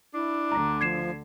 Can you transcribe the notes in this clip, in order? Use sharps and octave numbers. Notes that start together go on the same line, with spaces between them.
D4 E4
D2 D3 A#5
F3 G#6 C7 E7